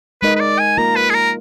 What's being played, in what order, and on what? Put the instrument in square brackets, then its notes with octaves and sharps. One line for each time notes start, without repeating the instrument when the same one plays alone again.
[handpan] G#3 D#4 A#4 D#5 [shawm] B4
[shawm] B4
D5
G#5
[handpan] A#3 F4 A#4 [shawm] A#5
[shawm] B4
G#4
A#4